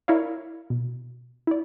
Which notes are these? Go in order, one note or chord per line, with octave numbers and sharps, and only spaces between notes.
E4 A#4 C#5 D5 F5
B2
E4 D5